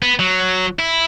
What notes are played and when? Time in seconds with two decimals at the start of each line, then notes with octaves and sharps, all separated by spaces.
0.02 B3
0.19 F#3
0.79 E4